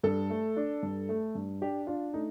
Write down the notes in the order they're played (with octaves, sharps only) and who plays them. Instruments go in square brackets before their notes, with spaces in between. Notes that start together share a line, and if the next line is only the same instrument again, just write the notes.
[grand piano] G2 [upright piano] A4
[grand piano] A3
D4
G2
A3
G2
[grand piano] D4 [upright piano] G4
[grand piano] D4 [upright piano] F4
[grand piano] A3 [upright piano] D#4